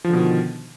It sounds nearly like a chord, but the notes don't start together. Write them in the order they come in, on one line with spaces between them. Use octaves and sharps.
F3 D3 B2 D#3